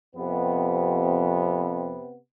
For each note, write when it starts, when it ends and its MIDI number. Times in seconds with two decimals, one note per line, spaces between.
0.16 2.00 41
0.16 2.15 48
0.16 2.15 59